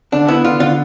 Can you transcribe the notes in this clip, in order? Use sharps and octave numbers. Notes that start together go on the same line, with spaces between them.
D3 D4
B3 E4
D3 F4
D3 F4